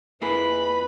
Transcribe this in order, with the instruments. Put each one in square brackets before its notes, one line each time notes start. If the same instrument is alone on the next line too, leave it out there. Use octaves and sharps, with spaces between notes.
[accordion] F2 B4 [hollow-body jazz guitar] A#3 E4 G#4 [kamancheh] B5